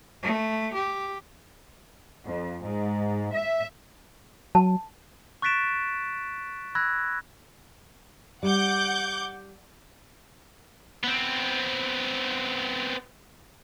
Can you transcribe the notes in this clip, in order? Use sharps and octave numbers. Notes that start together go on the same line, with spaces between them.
A3
G4
F2
G#2
E5
F#3 A5
C#6 F#6 A6 B6 D7 E7
B5 E6 F#6 G#6 A#6
G3 F#5 D6 G6
B3 C4